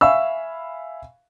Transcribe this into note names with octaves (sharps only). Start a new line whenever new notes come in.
E5 F5 G#5 B5 C#6 E6